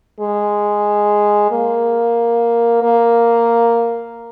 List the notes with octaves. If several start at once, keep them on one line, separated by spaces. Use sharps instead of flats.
G#3
A#3
A#3